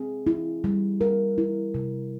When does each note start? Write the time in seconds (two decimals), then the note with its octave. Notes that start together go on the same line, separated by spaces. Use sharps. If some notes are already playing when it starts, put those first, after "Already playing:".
Already playing: C4 G#4
0.27 E4
0.64 G3
1.01 A#4
1.38 E4
1.74 C3